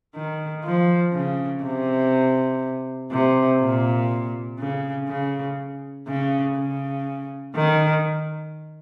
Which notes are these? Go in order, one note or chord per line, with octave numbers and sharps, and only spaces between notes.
D#3
F3
C#3
C3
C3
A#2
C#3
C#3
C#3
C#3
D#3